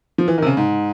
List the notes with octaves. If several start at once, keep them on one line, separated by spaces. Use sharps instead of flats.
F3
E3
D#3
C3
C#3
G#2